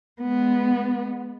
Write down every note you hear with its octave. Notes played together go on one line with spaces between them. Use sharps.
G#3 B3